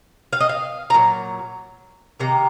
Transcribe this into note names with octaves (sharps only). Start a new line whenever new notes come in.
F5
D#5
F5
A#5
A#2 F#3
C3 D#3 A#3 A#5